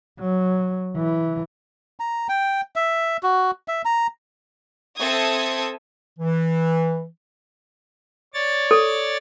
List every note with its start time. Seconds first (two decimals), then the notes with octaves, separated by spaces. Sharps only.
0.20 F#3
0.97 E3
2.00 A#5
2.29 G5
2.76 E5
3.23 F#4
3.68 E5
3.85 A#5
4.98 C4 A4 E5 D#6 G#6
6.19 E3
8.34 C#5 D5 A6
8.71 A4